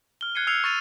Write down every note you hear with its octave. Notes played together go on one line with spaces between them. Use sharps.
F6 G7
F#6 G#6 C7 C#7 D#7
E6 F6 G#6 C7 C#7 F7
C#6 A6 D#7 F7